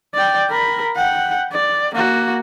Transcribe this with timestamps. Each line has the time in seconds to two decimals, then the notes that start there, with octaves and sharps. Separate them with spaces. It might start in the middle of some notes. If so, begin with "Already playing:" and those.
0.14 D5 G5
0.50 A#4 B5
0.96 F#5 G5
1.52 D5
1.95 A#3 F#4